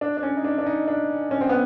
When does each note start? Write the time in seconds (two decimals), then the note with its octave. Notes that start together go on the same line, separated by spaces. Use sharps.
0.01 D4
0.17 D4
0.23 C#4
0.37 D#4
0.45 D4
0.58 D4
0.66 D#4
0.88 D4
1.31 C#4
1.41 C4
1.49 B3